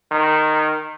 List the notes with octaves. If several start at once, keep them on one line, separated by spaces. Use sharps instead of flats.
D#3